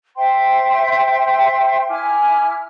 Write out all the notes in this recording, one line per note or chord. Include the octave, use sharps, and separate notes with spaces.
C5 E5 G5 C6
E4 G#5 D6 F6